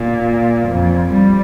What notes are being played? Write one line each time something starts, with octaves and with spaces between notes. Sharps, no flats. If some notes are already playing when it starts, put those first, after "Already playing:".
Already playing: A#2
F2
G3